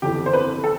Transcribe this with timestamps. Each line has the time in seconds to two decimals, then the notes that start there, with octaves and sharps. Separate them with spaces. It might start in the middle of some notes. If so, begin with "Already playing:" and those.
0.02 G1 F2 E3 G4
0.26 C5
0.34 B4
0.64 A4